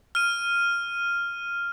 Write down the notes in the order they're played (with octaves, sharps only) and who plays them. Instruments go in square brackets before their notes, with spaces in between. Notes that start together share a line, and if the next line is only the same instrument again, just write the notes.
[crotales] F6 D#7